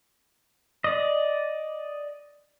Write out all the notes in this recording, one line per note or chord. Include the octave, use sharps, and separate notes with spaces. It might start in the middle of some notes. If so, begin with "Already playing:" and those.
D5 D#5